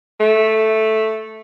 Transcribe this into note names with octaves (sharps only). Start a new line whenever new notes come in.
A3